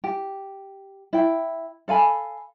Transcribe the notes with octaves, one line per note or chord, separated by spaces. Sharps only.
G4
E4 G5
A4 F5 G#5 B5